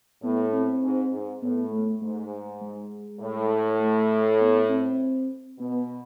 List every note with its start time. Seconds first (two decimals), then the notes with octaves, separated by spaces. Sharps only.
0.22 A2 B3
0.53 C4
0.82 G#2
1.12 G#2
1.42 A2 B3
1.72 A3
2.02 G#2 A3
2.62 G#3
3.21 A2
3.80 A3
4.40 B3
4.70 C4
5.59 B2 B3